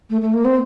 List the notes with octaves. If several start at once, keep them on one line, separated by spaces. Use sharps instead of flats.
A3
A3
A#3
C4